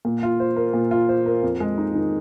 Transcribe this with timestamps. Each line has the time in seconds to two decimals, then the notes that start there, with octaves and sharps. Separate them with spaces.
0.05 A#2
0.23 F4
0.40 C5
0.56 A#3
0.74 A#2
0.91 F4
1.09 C5
1.26 A#3
1.43 F2
1.60 G#3
1.78 D#4
1.95 D#3